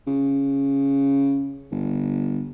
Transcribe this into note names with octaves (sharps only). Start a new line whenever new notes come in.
C#3
G1